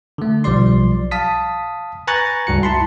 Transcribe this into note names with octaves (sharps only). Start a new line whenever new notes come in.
D3 A3
B1 F3 G3 D5 C6
F5 A5 D#6 B6
B4 G#5 A#5 C#6 F#6 A6
C#2 G2 F#4 C#7
E4 A5 B5 C6